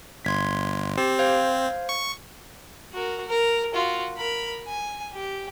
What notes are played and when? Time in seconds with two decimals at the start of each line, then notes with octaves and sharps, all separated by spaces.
0.25 G1 C6 G#6 B6
0.97 C4 G4
1.19 C5 F5 G#6
1.89 C#6
2.93 F#4 A#4
3.27 A#4
3.74 F4 F#4
4.17 A#4 B5
4.67 G#5
5.13 G4